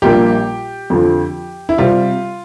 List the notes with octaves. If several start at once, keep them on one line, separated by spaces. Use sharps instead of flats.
A#1 A#2 G3 A#3 G4
F2 D3 F3
E4
C3 G3 C4 F4